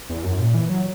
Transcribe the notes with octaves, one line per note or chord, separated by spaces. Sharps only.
E2
F#2
A#2
E3
F#3